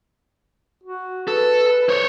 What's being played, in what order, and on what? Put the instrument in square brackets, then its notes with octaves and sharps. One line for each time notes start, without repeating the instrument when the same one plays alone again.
[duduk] F#4
[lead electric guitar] A4 [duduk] B4
[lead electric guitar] C5 C#5